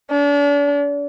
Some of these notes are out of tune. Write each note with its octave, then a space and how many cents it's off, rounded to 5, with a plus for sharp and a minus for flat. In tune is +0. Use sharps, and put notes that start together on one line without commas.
D4 -40